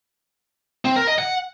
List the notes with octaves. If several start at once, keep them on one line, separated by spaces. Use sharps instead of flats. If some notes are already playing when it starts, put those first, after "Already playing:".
C4
A#4
D#5
F#5